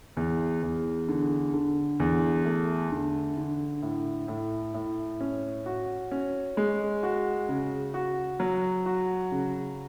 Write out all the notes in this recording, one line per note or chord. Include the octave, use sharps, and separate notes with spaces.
E2
E2
D3
D3
E2
A3
D3
D3
A2
A2
A2
C#4
F#4
C#4
G#3
F#4
C#3
F#4
F#3
F#4
C#3